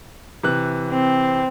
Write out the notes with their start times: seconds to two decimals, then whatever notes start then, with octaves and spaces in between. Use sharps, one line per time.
0.43 C3 E3 F#6
0.90 C4